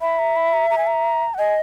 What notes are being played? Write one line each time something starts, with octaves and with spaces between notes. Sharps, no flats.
E5 B5
A#5
B5
A#5
A#5
G#5
A#5
F#5
D#5 G#5